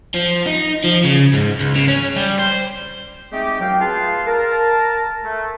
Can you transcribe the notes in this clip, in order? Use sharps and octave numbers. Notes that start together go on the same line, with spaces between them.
F3
D#4
F3
C#3
G#2
C#2
C#3
C#4
G3
C5
G#3 A3 C4 D#4 G4
F#2 F#3 F5 G5
F4 G#4 B4 F5 A5 C6
A#4 A5
A3